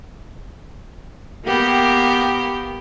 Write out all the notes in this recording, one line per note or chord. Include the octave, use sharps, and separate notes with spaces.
A#3 B3 G4